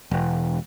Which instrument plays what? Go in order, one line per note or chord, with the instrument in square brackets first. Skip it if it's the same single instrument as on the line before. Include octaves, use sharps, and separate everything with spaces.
[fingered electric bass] E1